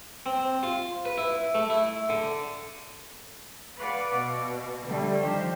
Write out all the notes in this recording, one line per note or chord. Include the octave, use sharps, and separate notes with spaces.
C4
F4
B4
E4
A3
E4
D3
B4 D5 F5 F#5
B2
D3 G3 A3
D#3 F3 G4 C5